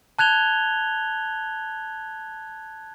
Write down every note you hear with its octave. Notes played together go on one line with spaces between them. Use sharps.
A5 F#6 G#6 F7 G7